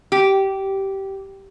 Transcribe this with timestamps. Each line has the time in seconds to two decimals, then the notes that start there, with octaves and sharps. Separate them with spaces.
0.12 G4